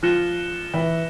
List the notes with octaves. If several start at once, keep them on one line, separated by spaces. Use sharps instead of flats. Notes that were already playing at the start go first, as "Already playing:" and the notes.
F3 F4 F#6 A#6 C#7 E7 G7
E3 E4